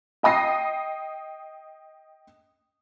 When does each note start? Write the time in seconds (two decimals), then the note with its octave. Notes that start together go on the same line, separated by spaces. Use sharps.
0.23 D#5 G5 D#6 A#6 C7